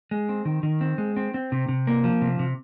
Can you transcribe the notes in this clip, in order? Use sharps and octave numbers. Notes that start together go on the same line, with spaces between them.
G#3
C4
D#3
D#3
C4
G#3
C4
C4
C3
C3
A#3
F3
C3
C3